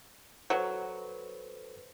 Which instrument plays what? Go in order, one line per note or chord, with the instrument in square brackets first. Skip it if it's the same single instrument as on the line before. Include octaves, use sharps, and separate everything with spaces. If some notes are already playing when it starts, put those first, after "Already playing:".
[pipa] F#3 [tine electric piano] A4 B4 C5